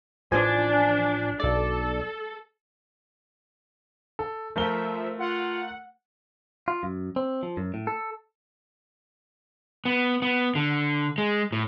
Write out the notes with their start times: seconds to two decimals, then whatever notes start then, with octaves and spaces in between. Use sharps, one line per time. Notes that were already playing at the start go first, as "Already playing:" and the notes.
0.31 A1 F3 D4 G#5
1.40 B1 A4 D5
4.19 A4
4.56 F3 A3 A#4 E5 G7
5.19 F4 F#5
6.68 F4
6.83 F#2
7.16 C4
7.43 F3
7.57 F#2
7.74 A2
7.87 A4
9.85 B3
10.22 B3
10.55 D3
11.18 G#3
11.52 A2